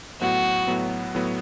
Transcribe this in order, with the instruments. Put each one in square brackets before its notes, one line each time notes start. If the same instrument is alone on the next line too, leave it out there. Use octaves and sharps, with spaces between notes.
[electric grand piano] A2 F#3 B3 [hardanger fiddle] F#4
[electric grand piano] A2 F#3 B3
A2 F#3 B3